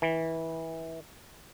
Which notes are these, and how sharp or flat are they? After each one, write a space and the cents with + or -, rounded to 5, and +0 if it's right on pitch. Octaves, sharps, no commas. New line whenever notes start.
E3 -20